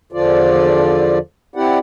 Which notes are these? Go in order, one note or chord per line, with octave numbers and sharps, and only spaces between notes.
E2 D3 F3 F4 D5
C4 E4 G4 D5 F#5